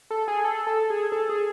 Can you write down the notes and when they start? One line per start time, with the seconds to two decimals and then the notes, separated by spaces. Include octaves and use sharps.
0.11 A4
0.28 G#4
0.44 A4
0.67 A4
0.90 G#4
1.12 A4
1.29 G#4